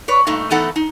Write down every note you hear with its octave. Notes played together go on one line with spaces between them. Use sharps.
B4 C#5 D5
G2 A#2 A3 D#4
E3 A3 B3 D#4 A4 F#5
D#4